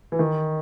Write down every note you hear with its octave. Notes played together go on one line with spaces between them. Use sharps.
E3
D#3